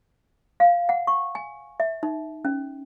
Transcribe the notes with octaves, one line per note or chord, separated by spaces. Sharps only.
F5
F#5
C#6
G#5
E5
D#4
C#4